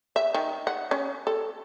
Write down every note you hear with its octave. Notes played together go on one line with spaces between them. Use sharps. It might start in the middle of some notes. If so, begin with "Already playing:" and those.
E5
D#3
F#5
C#4
A4